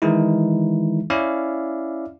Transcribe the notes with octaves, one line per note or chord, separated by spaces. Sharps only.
D#3 E3 G#3 D#4 E4
C#4 E4 D5 E5 F5